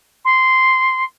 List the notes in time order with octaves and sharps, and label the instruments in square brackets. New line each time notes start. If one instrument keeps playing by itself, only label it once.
[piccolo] C6